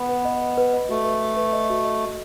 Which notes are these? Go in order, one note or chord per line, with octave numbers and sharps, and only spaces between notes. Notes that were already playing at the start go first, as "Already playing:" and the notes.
Already playing: B3
B4
D#5
D#5
B4
D#5
A3 F#4
B4
B4
B4
D#5
F#4
D#5
F#4